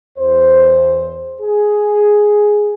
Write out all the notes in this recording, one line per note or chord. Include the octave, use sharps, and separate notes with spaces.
E2 C5
G#4